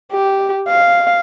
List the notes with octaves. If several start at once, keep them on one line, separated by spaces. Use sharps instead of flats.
G4
F5